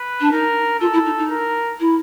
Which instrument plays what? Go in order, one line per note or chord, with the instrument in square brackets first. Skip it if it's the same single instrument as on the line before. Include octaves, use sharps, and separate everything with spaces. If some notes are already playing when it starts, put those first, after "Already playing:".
Already playing: [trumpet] B4
[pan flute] D4
[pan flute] D#4 [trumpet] A#4
[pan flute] F4 [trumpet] A4
[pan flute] E4
D#4
D#4
[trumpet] A#4
[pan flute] E4